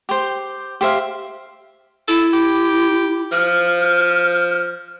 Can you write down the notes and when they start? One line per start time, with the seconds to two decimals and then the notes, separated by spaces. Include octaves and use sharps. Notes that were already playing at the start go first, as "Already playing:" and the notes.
0.09 G4 C5
0.81 G4 C5 E5 F5
2.08 E4 A4
2.33 G4
3.32 F3 F6